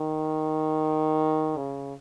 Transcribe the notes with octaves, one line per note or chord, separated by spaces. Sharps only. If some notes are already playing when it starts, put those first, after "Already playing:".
Already playing: D#3
C#3